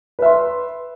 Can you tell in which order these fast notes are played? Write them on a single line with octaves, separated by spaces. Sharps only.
B4 E5 C6